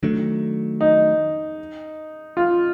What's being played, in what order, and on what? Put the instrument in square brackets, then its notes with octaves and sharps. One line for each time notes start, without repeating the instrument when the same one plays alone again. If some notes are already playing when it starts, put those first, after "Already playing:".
[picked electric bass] D#3 F#3 A3 D4
[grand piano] D#4
F4